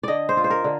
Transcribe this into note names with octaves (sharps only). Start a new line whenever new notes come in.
D3 D5 D#5
C5
F4
C5
A#4
D3